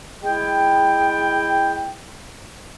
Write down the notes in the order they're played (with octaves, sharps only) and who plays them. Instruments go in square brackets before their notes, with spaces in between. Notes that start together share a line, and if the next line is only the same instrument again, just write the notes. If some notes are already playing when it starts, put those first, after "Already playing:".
[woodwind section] G#3 E4 G5